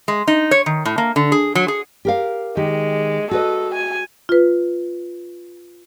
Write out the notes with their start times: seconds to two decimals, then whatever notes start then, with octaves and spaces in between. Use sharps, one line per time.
0.08 G#3
0.27 D#4
0.51 C#5
0.66 D#3
0.85 A2
0.98 A#3
1.16 D3
1.32 G#4
1.55 F#3
1.68 G#4
2.05 G4 A#4 F5
2.57 D#3 G#3 G4
3.31 F#4 A4 B4 D#5
3.75 G#5
4.29 F4 B4